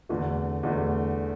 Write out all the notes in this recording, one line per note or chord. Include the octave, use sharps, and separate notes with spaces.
E2 D3 A3
E2 D3 A3